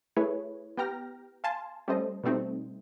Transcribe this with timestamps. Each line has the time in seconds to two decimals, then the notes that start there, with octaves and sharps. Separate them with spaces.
0.17 A3 E4 G#4 B4 C#5
0.77 B3 G4 G5 A#5 F6 A#6
1.44 F5 G#5 A5 C6
1.88 G3 A3 C#4 A4 C5 D#5
2.23 B2 G3 A3 C4 D#4